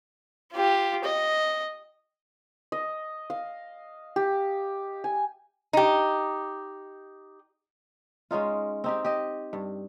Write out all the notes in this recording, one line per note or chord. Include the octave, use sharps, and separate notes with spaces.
F4 G4
D#5
D#5
F5
G4
G#5
D#4 G4
G#3 C#4 D#4 F4
C4 D#4 G4
G4 D#5
G2